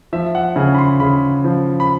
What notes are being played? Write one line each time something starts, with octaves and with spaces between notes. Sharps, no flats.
F3 E5
F#5
C#3 G#5
B5
C6
C#3 B5
F3
B5